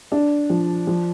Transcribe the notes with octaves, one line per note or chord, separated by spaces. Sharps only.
D4
F3
F3